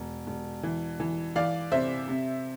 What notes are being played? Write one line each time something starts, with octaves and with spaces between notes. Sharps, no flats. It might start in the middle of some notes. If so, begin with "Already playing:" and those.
Already playing: E1
E1
E3
E3
E3 D5 F5
C3 C5 E5
C3